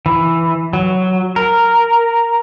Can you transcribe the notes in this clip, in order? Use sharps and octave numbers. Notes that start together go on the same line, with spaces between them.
E3
F#3
A#4